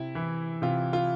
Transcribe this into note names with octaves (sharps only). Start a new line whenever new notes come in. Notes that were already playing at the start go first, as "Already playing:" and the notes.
Already playing: C3 E4
E3
C3 F4
F4